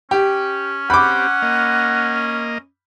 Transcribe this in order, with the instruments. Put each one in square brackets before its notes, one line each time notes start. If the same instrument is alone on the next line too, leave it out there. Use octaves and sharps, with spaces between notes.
[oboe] C#4 [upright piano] G4
[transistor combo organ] C4 G4 [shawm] F#5 [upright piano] B5 D6
[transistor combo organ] A#3 D#5